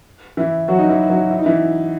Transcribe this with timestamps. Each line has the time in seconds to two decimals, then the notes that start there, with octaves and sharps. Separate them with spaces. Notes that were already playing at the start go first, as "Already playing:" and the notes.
0.37 E3 E4
0.68 F#3 F#4
0.79 D#4
0.89 E3 E4
1.10 F#3 F#4
1.31 E4
1.39 D#4
1.46 E3 E4